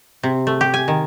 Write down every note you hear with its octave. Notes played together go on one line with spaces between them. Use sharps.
C3
A3
G4
G#5
D#3